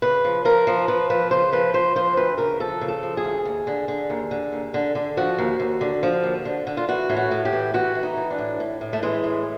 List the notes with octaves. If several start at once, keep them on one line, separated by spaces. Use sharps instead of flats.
C#3 B4
F3
F3 A#4
F3
F3 B4
F3 B4
C#3 C5
F3 B4
F3 C5
F3 C5
D2 B4
C#3 A#4
F3 A4
C#3
A4
F3
G#4
D2
D#2
D3
D3
D#2
D3
D#2
D3
D3
F3 F#4
D#2
D#2
D3
F3
D#2
D3
D3
F4
E3 F#4
A2
F#4
A2
G4
E3
E3 F#4
E3
D#4
E3
D4
A2
A2
A2
A3
E3 G#3
A2